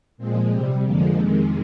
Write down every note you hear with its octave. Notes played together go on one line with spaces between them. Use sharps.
A#2 F3 G#3 C4
C3 G3 C4
F2 D3 F3 G#3 A#3
F2 C3 D#3 G#3